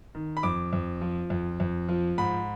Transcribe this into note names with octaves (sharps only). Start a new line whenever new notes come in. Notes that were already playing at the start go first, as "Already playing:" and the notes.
D#3
B5
F2 D6
F2
F3
F2
F2
F3
G#2 B5